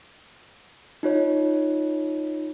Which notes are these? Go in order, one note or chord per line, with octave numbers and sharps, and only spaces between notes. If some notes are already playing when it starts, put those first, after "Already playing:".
D#4 F4 C#5